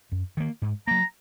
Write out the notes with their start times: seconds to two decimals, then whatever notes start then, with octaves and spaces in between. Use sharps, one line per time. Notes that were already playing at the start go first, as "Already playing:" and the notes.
0.12 F#2
0.37 D#3 A#3
0.62 G#2
0.87 F#3 A#3 A#5